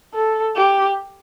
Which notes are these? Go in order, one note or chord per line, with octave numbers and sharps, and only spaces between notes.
A4
G4